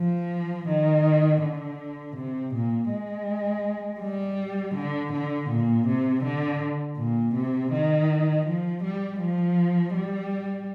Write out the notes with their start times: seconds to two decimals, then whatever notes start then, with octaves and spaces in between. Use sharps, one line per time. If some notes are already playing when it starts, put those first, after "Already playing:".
Already playing: F3
0.68 D#3
1.42 D3
2.16 C3
2.54 A#2
2.90 G#3
4.01 G3
4.75 D3
5.12 D3
5.49 A#2
5.87 C3
6.24 D3
6.98 A#2
7.35 C3
7.72 D#3
8.45 F3
8.83 G3
9.21 F3
9.94 G3